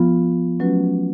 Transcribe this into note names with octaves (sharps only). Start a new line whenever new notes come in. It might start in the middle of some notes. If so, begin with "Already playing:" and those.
Already playing: F3 B3 F4
F#3 A3 C#4 F#4 B4